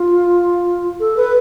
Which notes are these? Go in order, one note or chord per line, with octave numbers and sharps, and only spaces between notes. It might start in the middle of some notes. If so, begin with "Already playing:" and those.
Already playing: F4
A4
B4